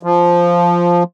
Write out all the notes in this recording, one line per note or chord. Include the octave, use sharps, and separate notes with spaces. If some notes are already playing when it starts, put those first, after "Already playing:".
F3